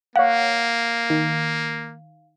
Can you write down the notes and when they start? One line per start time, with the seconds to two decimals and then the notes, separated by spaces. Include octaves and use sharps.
0.16 A#3 C#5 F5 F#5
1.10 D#3